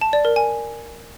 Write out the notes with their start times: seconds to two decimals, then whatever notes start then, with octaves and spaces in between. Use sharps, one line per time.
0.01 A5
0.13 D5
0.25 A#4
0.36 G#5